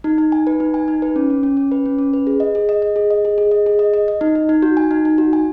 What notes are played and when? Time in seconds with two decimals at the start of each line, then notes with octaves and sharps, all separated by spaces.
0.04 D#4
0.18 D#4
0.32 G#5
0.47 B4
0.60 D#4
0.74 G#5
0.88 D#4
1.02 B4
1.16 C#4
1.30 C#4
1.43 C#4
1.57 C#4
1.72 B4
1.86 C#4
1.98 C#4
2.13 B4
2.27 G#4
2.40 D#5
2.55 G#4
2.69 D#5
2.82 D#5
2.96 G#4
3.11 D#5
3.25 G#4
3.38 G#4
3.51 D#5
3.66 G#4
3.79 D#5
3.94 D#5
4.08 D#5
4.21 D#4
4.35 D#4
4.49 D#4
4.62 F#4
4.77 G#5
4.91 D#4
5.05 D#4
5.18 F#4
5.33 G#5